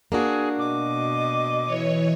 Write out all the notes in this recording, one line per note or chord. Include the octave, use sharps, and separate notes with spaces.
A#3 D4 F#4 G#4
B2 D#5 D6
E3 C#5